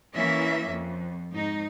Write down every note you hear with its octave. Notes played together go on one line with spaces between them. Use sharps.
E3 A#3 C#4 E5
F2
G#2 D#4